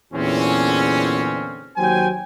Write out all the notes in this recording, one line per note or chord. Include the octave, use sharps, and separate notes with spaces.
E2 A#2 D3 E3 C4 C#4
D#2 F#3 C5 G5 G#5